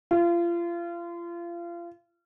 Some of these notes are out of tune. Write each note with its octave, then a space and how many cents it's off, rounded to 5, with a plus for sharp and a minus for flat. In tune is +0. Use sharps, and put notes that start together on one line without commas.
F4 -30